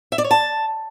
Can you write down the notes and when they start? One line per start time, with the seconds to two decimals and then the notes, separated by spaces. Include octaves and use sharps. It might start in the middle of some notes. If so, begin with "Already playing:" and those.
0.12 E5
0.18 D5
0.24 C#5
0.31 A5